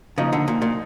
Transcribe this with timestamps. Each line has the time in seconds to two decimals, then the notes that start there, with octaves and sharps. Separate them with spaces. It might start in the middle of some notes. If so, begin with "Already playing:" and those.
0.18 C#3 F3 A#3 D#4
0.33 D3
0.48 A#2
0.62 A#2